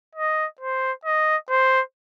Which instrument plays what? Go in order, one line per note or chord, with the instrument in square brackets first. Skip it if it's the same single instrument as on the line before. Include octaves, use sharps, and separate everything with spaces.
[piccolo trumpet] D#5
C5
D#5
C5